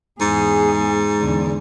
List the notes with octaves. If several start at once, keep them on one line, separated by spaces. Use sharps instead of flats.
E2 G#2 G#4
E2 D3